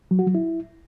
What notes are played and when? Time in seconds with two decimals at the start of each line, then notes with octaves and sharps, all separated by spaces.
0.11 F#3
0.19 F#4
0.27 F#3
0.35 E4